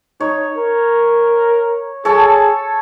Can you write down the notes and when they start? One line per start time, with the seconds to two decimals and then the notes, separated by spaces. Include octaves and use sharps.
0.20 D#4 C#5
0.57 A#4
2.05 G#4 A4 C#5 A5